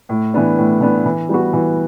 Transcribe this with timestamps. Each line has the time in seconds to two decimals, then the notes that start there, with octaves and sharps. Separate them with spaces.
0.09 A2
0.34 E3 B3 D4
0.58 A2
0.81 E3 B3 D4
1.06 E3
1.29 G3 B3 F#4
1.53 E3